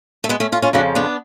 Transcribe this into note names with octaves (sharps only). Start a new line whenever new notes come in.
A3
G#3 B3
A3 C#4
C#4 F4
C#4 F4
F2 C#3 F3 D4 F#4
B3 D4